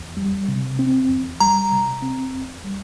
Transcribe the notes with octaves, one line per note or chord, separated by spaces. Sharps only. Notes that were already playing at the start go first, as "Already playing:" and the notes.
Already playing: E2
G3
C3
C4
E2
G3 A#5
C3
C4
E2
G3